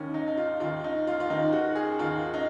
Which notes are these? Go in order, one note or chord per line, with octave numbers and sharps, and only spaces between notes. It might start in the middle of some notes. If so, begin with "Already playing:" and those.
Already playing: D#2 D#3 C#4
D#4
D#4
F4
D#2 D#3 F4
D#4
F4
F4
D#2 D#3 D#4
F#4
G#4
D#2 D#3 F4
D#4